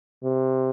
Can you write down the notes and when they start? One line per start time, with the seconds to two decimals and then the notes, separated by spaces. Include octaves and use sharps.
0.23 C3